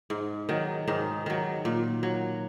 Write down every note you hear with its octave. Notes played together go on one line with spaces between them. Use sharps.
G#2
D#3 F#3
G#2 D#3 D#4
D#3 F#3
A#2
F#3